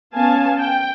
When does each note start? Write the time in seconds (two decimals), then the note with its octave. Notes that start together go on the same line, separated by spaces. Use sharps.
0.14 B3 C#4 F5 G#5 A5
0.59 G5